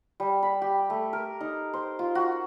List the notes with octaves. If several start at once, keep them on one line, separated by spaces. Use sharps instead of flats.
G3
B5
G4
A3
A#4
D#4
C5
F4
F#4